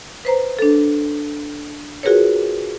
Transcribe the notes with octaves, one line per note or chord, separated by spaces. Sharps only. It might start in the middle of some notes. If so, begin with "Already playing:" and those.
B4 C5 A#5
D4 A4
F4 F#4 G#4 A#4 B4 C#5